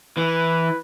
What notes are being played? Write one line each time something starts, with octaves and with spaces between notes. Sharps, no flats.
E3 B4